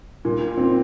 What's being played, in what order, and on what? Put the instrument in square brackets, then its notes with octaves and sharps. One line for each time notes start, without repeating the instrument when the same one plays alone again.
[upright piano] A#2
C4